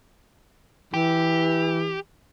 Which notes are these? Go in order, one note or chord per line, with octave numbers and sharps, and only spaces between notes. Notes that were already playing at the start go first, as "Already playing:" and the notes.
E3 G4